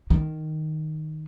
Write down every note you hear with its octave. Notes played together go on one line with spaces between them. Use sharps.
D#3